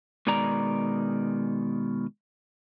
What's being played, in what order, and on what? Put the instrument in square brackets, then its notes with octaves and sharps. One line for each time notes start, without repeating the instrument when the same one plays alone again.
[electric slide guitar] B2 D#3 G#3 D5 A#5